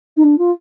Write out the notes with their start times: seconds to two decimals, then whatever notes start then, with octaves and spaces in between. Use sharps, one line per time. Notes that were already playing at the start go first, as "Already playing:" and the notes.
0.16 D#4
0.23 D4
0.38 F4